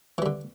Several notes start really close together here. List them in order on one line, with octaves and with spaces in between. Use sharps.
E3 G3 D3